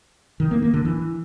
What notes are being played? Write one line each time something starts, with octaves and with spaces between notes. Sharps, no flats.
D#3
A#3
A#3
D3
E3